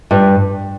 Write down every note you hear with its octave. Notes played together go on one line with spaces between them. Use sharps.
G2